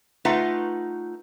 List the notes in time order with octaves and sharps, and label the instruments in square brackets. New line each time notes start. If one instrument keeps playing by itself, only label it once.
[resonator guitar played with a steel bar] A3 D#4 F4 B4 F#5